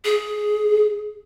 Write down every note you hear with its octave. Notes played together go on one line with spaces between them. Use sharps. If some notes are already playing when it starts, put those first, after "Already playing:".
G#4